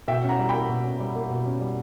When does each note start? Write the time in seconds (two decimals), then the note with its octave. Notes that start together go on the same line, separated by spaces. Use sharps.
0.08 B2 E5 G5
0.23 C#4
0.29 F#5 A#5
0.39 G3
0.49 A#3 G5 B5
0.69 B2
0.84 C#4
1.00 G3
1.16 A#3
1.30 B2
1.46 C#4
1.61 G3